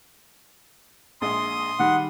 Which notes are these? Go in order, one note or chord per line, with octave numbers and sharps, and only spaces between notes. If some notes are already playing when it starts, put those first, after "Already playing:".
A#1 G#3 C6 D#6
D#3 G3 F#5